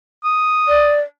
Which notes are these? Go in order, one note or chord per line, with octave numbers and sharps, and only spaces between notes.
D#6
D5